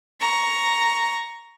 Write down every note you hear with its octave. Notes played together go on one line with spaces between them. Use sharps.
A#5 C#6